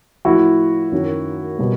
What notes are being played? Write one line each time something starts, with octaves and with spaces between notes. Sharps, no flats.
A2 F3 A#3 E4 F#4
F#2 D#3 F#3 A#3
B2 G3 A#3